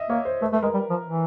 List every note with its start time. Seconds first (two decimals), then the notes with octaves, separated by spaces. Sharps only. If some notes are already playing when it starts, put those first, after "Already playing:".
Already playing: D#5 E5
0.09 A#3 C#5
0.25 C5
0.41 A3 B4
0.52 A3 B4
0.63 G#3 A#4
0.74 G3
0.90 F3
1.06 E3